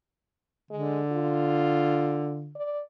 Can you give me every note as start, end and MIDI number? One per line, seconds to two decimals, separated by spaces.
0.71 2.56 50
0.71 1.01 56
1.12 2.46 65
2.56 2.82 74